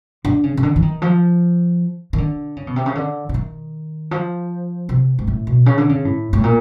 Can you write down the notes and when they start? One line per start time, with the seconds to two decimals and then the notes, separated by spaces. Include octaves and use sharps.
0.25 D3
0.44 C#3
0.57 C#3
0.63 D3
0.76 E3
0.82 D#3
1.02 F3
2.13 D#3
2.18 D3
2.56 C#3
2.67 B2
2.76 C3
2.86 C#3
2.95 D3
3.29 D3
3.34 D#3
4.11 F3
4.89 C3
5.19 G#2
5.27 A2
5.47 B2
5.66 C#3
5.78 D3
5.89 C#3
6.05 A2
6.33 A2
6.44 A#2